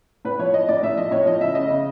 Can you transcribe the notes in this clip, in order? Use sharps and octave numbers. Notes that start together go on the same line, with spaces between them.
A2 B4
F3 C#5
F3 D#5
A2 D5
A2 E5
F3 D#5
A2 C#5
F3 D#5
C#3 E5
C#3 D#5
C#3